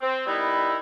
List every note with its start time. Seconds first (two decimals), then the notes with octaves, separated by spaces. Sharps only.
0.01 C4
0.27 D#3 G3 B3 D#4 E4